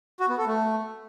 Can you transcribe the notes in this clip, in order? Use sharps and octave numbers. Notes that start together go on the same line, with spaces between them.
F#4
B3
A4
A3